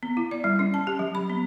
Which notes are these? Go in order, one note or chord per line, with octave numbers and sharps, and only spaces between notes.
B3
E4
D5
G3
C#4
A5
G4
F#3
B5
B3